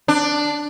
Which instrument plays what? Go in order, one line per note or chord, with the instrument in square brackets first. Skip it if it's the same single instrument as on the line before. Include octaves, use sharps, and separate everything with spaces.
[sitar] D4